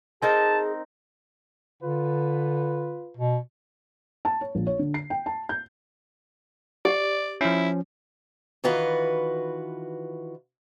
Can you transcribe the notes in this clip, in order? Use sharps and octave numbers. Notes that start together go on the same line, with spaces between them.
C4 D#4 G#4 A#4 A5
D3 F4 B4
B2
A5
C#5
A#1
C#5
D3
C7
G5
A5
G6
G4 D5
F3 C#4 E4
D#3 E3 F4 F#4 B4